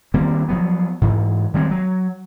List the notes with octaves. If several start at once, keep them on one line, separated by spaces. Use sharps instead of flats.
D#3 G3 A#3 C4
F3 F#3 B3
G#2 E3
D#3 G3 G#3 C4
F#3